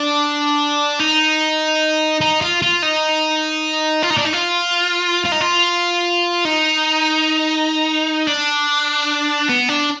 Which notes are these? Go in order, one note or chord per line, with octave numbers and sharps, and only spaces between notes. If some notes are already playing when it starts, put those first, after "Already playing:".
Already playing: D4
D#4
D#4
F4
F4
D#4
F4
D#4
D4
D#4
F4
F4
D#4
F4
D#4
D4
B3
D4